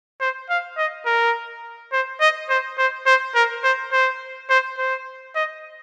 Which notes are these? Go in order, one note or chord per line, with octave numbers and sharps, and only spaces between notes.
C5
F5
D#5
A#4
C5
D#5
C5
C5
C5
A#4
C5
C5
C5
C5
D#5